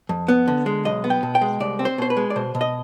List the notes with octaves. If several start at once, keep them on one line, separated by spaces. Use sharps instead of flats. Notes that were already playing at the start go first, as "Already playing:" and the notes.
F2
B3
D3
G#3
B1 D#5
B3
G5
B2
G5
G#3
C2 D5
C4
C5
B2 C5
B4
G#3
D5
B2 C5
B2
D#5